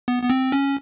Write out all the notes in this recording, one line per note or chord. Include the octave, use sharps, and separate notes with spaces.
B3
B3
C4
C#4